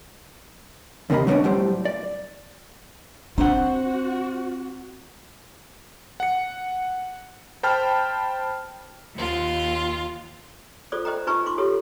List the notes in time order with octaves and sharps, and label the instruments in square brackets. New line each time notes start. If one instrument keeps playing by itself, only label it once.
[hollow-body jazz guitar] D#2 C3 A#3 D#5 B5
F#3 A3 B3 C#4 D4
A2 F#3 G3 C5
D5
[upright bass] C4 [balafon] D4 [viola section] F#4 [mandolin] C5 F#5
[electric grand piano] F#5 C#7
C5 G5 A5 B5 F6
[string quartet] D#2 F4
[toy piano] F4 A4 C5 D5 D#6
C5 D#5 G5 A#5
D#4 F4 B4 G#5 A#5 C#6
F4 C6 D6
F4 G4 A4 C#5